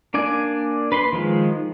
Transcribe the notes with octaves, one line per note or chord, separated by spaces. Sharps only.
A#3 D4 D5 G#5
B4 B5 C6
D#3 F3 G#3